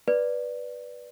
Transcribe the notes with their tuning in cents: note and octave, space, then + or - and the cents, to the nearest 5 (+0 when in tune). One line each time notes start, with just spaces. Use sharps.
B4 -10 D5 +5